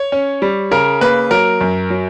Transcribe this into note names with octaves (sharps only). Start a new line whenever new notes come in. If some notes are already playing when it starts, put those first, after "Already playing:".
Already playing: C#5
C#4
G3
C#3 A#4
A#3 B4
F#3 A#4
F#2
F#3